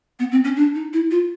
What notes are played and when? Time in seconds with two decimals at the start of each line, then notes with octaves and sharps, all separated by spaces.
0.19 B3
0.31 C4
0.44 C#4
0.56 D4
0.75 D#4
0.93 E4
1.11 F4